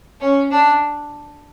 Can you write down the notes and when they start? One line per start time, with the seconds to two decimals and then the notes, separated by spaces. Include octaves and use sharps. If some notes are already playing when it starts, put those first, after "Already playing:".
0.20 C#4
0.50 D4